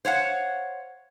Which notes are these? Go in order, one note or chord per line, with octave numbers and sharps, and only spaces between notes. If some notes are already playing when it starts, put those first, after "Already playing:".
C5 C#5 F5 F#5